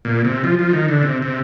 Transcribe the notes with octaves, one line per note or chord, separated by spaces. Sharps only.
A#2
C3
F3
F3
D#3
D3
C3
C3